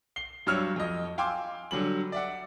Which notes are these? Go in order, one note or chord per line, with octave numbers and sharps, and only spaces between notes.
C7 G7
G2 F#3 G3 C#5 E6 F6
F2 D#5
F5 G5 G#5 C6 D6 E6
D3 F#3 G3 F#7
D5 E5 F#5